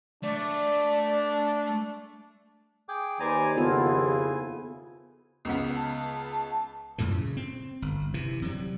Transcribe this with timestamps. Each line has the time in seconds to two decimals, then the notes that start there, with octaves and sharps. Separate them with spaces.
0.23 A3 D4 D5
2.89 G#4 G5 D6
3.20 D#2 B4 C5 D5 G#5 A#5 D6
3.57 F2 C#3 B3 E4 F4 A4 G#5
5.45 C#2 C#3 B3
5.76 A5
6.98 F#2 A#2 D3 E3
7.11 C#3
7.37 C4
7.82 G1
8.14 C3 E3
8.42 C3 F#3 G3